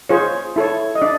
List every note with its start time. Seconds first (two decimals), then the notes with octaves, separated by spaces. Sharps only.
0.09 F4 G#4 C5 C#5
0.56 E4 A4 C#5
0.95 D#5
1.02 D4 D5